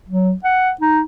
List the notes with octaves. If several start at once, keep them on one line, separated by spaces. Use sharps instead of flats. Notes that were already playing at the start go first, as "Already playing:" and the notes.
F#3
F#5
D#4